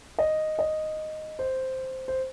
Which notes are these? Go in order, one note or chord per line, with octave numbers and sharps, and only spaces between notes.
D#5
D#5
C5
C5